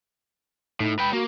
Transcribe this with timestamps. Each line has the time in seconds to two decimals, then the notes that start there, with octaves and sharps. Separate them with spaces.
0.80 A2 D#4
0.99 B4 G5 B5
1.13 A#3 F#4